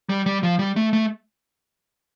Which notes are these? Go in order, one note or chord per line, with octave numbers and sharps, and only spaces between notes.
G3
G3
F3
G3
A3
A3